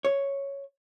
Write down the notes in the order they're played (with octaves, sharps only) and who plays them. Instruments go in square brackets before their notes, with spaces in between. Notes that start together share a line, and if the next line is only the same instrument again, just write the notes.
[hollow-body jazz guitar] C#5